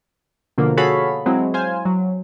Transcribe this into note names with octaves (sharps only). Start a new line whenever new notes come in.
B2 D3 F3 A#3
F#4 G#4 A4 C#5 F5 B5
F#3 G#3 C4 E4
C5 F5 G#5
F#3